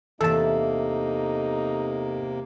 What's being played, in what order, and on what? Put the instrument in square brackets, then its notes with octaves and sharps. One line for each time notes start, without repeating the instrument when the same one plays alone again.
[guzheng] E2 E5 [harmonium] C3 A#3 [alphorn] D#4 [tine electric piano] A4 A5